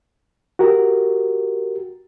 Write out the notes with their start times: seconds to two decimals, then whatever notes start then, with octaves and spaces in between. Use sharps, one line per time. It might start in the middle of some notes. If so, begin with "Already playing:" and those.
0.59 F#4 G4 A#4